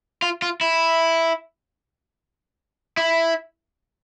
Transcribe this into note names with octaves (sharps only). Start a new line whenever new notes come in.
F4
F4
E4
E4